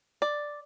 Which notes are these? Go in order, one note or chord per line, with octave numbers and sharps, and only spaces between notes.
D5